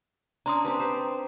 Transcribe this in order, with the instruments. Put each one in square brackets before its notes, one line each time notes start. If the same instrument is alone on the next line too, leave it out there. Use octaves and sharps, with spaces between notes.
[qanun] C#4 D4 [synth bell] A#5 C6 D#6
[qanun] C4 G4 B4
G4 C5